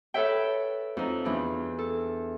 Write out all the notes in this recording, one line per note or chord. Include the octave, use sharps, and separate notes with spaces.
A4 B4 C#5 E5 G5
F2 D#4
E2 E3 D4
A4